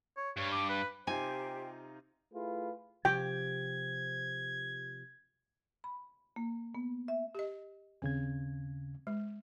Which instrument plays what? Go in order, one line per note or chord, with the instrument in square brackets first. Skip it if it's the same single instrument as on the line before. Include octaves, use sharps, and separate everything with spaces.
[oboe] C#5
[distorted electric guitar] G2 [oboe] C#5
[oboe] D6
B4
[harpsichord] C3 [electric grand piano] D#4 F4 [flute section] G4 C5 G5 [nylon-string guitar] G#5
[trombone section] A3 E4 F4 G#4 B4
[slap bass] C3 F3 [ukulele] G4 [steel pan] G5 [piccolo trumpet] G#6
[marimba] B5
A#3
B3
E5
[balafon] G4 D#5
[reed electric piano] D#2 C#3 G#6 [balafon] C4
[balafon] G#3